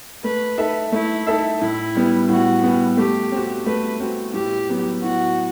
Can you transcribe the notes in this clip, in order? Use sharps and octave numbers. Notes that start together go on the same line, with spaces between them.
A3 B4
D#4 A4 E5
A3 E4
D#4 A4 E5
A2 E4
G3 B3
A2 F#4
G3 B3
A3 G4
C4 F#4
A3 B4
C4 F#4
A2 G4
F#3 B3
A2 F#4